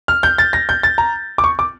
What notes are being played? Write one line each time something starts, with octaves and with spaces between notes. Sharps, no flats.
F6
G6
A6
A#6
G6
A6
A#5
D6
C#6
D6